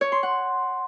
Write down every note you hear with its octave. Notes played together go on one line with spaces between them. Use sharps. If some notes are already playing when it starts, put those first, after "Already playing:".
C#5
C6
F#5